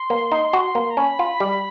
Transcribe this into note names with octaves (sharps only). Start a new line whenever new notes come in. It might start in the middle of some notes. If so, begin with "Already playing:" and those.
Already playing: C6
A#3
D#4
F#4
A#3
A#5
C#4 B5
F4
G3